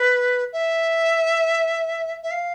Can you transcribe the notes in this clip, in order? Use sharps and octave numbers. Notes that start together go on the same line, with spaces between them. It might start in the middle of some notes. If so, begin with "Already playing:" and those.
Already playing: B4
E5
E5
F5